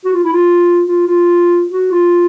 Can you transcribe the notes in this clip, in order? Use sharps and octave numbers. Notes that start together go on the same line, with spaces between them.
F#4
F4
E4
F4
F4
F4
F#4
F4